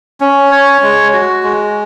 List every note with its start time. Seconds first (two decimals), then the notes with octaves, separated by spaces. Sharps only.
0.21 C#4
0.51 C#5
0.82 G#3
1.13 F#4
1.43 G#3